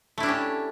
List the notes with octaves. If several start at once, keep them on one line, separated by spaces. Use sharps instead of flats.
A3 C#4 D4 E4 G4